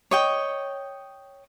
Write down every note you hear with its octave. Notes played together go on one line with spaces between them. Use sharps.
C#5 D#5 G5